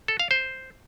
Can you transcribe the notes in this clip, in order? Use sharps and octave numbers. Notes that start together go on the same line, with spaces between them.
A4
F5
C5